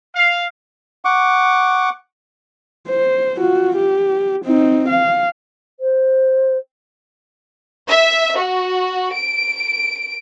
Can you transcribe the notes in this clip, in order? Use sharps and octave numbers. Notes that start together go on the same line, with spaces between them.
F5
F#5 C#6 D6
C5
F4 F#4
G4
C4 D#4
F5
C5
E5
F#4
D7